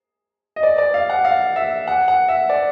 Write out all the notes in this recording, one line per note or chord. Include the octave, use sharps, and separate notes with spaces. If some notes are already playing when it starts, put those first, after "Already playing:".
D#5
D5
D5
F5
F#5
F5
E5
F#5
F#5
E5
D5